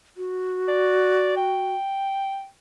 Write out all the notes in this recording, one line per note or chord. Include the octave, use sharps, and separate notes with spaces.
F#4
D5
G5